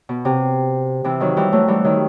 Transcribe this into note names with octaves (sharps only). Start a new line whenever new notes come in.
B2
C3
C3 E3
D#3 F#3
E3 G3
F#3 A3
E3 G3
D#3 F#3